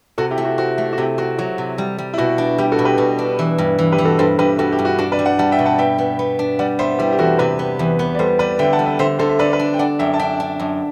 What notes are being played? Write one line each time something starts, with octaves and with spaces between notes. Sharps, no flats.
C3 F#4 A4
E4 G4
A3
F#4
C4 F#4
A3
F#4
C3 E4 G4
C4 F#4
F#3 F#4
C3
G3
G3
E4
B2 F#4
D4
G3 E4 G4
F#4 A4
B2
G4 B4
B2
D4
E3
G2
E3
G4 B4
E3
F#4 A4
G2 A4 C5
G2 G4 B4
G2 F#4 A4
E4 G4
G2
F#4
D4 F#4
B4 D5
G3
D5 F#5
G3 F#5 A5
E5 G5
B2
F#5 A5
B3 E5 G5
B3
B3
D4
G3 D5 F#5
B3 C5 E5
G3 E4 G4
G4
E2 F#4 A4
C3 G4 B4
B3
E2
B3
D5
G3 A4 C5
G3 B4 D5
D3 E5 G5
F#5 A5
G3
E5 G5
D3 C5 E5
D3 A4 C5
E5
D3 B4 D5
B4 D5
D4
G5
D4 D5 F#5
F#2 E5 G5
A5
D4 E5 G5
D4
F#2